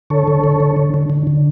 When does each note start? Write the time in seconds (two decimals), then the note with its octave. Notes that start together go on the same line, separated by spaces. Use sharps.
0.10 D3 A4 C#5
0.27 D3
0.44 D3
0.60 D3
0.77 D3
0.94 D3
1.10 D3
1.27 D3